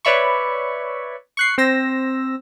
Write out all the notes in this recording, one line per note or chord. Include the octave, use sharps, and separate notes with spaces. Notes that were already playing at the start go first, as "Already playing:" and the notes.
B4 C#5 D5 E5 B5 C#6
C#6 F#6 C7
C4 C5 E6 A#6